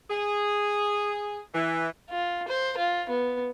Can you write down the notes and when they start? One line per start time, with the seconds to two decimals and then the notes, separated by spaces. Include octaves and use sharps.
0.09 G#4
1.53 E3
2.10 F4
2.48 C5
2.78 F4
3.10 B3